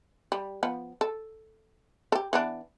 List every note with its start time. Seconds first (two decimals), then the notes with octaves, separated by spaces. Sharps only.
0.32 G3
0.63 F3 B3
1.01 A4
2.12 G4 A4
2.33 E3 B3 D4